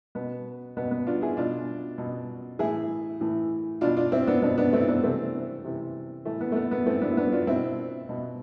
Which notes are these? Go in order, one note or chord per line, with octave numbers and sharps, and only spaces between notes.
B2 B3
B2 B3
B3
D4 F4
E4 G#4
B2 D4 F4
B2
A2 E3 E4 G#4
A2 E3
B2 D4 F4
D4 F4
C4 E4
B3 D4
B2 B3 D4
B3 D4
A3 C4
E4
B3 D4
C3 E3 A3 C4
C3 E3
A2 E3 A3
B3
A3
B3
B3
A2 E3 A3 C4
B3 D4
E4
B3 D4
D4 F4
B2 C4 E4
B2